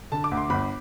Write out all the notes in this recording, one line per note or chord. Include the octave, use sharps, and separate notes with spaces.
D3 A5
D6
D2
C6
G1 B5